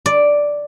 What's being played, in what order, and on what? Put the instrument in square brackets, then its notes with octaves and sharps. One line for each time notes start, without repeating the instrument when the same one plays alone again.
[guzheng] D5